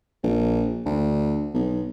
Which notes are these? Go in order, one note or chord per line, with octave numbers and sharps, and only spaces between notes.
A#1
D2
B1